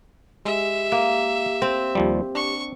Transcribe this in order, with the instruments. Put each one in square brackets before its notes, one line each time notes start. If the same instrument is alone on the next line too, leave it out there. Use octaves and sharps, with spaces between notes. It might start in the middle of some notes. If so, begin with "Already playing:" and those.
[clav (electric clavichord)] G#3 [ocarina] G4 [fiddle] E5
[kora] A#3
C4
[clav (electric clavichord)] D#2 F3 G3
[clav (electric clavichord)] D4 [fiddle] C#6